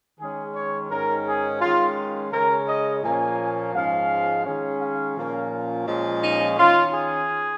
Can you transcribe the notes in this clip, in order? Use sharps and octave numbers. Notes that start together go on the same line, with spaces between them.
D#3 G#3 C#4 G#4
C#5
G#2 D#3 C#4 A#4
G#4
D#3 G#3 C#4 F4
C#3 G#3 C#4 A#4
D#5
A#2 F3 A#3 C#4 G#5
G#2 F3 G#3 C#4 F5
D#3 G#3 C#4
F5
A#2 F3 A#3 C#4
A#2 F3 G#3 C#4
D#4
D#3 C#4 F4
G#4